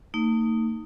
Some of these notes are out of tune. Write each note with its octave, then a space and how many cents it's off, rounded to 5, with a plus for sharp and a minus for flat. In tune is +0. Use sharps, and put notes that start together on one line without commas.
A3 +45 D#4 +0